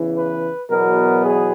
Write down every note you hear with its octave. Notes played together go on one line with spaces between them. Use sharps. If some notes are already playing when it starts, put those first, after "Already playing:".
Already playing: E2 C#3 E3
B4
E2 B2 F#3 B3 A#4
G#4